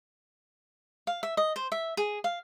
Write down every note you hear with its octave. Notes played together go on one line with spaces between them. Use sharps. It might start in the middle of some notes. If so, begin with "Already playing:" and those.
F5
E5
D#5
C5
E5
G#4
F5